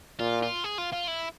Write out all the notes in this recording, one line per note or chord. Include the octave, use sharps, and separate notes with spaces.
A#2 F4
F4
G#4
F4
F4
E4